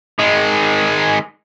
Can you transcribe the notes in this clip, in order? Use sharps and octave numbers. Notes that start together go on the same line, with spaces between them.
D#3 G#3